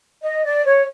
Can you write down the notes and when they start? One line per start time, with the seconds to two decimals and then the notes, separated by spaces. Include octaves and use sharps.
0.22 D#5
0.44 D5
0.65 C#5